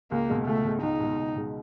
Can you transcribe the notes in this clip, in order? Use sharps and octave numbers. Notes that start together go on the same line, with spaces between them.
C#2 A#3
B2 G#3
C#2 A3
B2 G#3
C#2 D#4
B2 G#3
C#2
B2 G#3